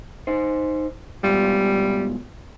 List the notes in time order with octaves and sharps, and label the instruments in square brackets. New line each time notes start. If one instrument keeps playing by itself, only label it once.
[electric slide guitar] D#4 C5
[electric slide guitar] G#2 B2 F4 [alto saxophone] G3